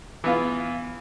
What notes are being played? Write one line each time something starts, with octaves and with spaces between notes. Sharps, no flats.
E3 B3 F4